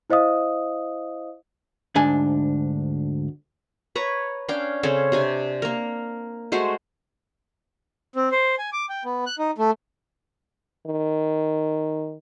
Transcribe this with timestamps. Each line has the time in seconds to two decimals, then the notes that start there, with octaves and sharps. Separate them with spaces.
0.10 E4 C5 D#5 F5 D#6
1.95 D2 G#2 D4 G#5
3.95 B4 C#5 A#5
4.48 C#4 D4 F5 G5
4.83 C#3 C4 C#4 A4
5.12 C3 D4 G#5
5.62 A#3 A#4
6.52 G#3 A3 F#4 C5
8.16 C4
8.32 C5
8.59 G#5
8.73 D6
8.89 G5
9.05 B3
9.27 F#6
9.39 D#4
9.58 A3
10.87 D#3